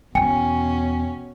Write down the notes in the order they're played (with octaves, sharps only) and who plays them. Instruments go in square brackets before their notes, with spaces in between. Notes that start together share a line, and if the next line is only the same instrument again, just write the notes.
[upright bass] E2 B3 [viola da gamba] B2 C#4 [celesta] G5 G#5 C#7